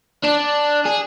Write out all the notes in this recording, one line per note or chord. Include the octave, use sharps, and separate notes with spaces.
D4
G#4